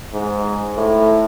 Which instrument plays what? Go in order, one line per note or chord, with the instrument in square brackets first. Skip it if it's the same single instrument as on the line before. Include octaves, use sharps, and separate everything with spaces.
[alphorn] G#2
A2